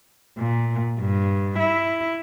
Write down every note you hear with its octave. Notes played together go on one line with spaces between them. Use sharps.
A#2
G2
E4